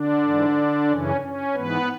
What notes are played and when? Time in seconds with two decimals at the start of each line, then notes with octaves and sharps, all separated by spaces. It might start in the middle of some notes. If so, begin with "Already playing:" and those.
Already playing: D3 D4
0.22 G#2 E3
0.88 F#2 C#3 E3 C#4
1.21 C#4
1.54 G#2 E3 B3 B4